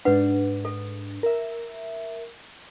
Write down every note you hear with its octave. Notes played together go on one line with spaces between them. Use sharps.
G#2 D4 B4 F#5
A4
A#4 E5